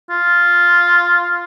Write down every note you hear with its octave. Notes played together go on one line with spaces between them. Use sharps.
F4